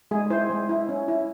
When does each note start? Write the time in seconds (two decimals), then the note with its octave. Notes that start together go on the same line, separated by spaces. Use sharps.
0.11 G#3 G#4
0.30 E4 C5
0.50 G#3
0.69 E4
0.89 C#4
1.08 E4